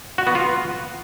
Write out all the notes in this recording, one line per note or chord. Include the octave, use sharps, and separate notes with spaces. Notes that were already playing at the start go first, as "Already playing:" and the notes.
F#4
B3
F4